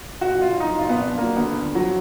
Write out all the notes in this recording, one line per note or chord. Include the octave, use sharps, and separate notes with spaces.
A#2 F#4
A#1
F4
A#1
F#3 D#4
A#2 F4
B3
A#1 D4
A#1
F#3 A#3
D3 B3
D2
D2
F#3
F3